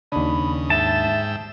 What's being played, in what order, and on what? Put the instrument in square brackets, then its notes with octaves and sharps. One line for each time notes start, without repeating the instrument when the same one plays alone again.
[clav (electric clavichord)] D#2 D4 [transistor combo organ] C#3 D#5 [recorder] B5
[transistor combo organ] G#2 G5 E6 [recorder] E5 [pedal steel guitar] A5